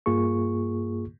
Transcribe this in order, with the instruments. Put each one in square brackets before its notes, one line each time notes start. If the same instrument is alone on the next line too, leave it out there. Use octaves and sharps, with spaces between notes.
[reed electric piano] G2 A#3 F4 G#4 C#6